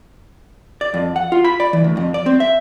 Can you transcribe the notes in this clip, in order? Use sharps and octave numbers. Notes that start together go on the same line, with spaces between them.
D5
F2
F#5
F4
B5
D5
E3
D2
F2
D5
C4
E5